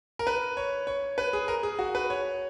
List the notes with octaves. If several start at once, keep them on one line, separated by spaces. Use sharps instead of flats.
A#4
B4
C#5
C#5
B4
G#4
A#4
G#4
F#4
B4
C#5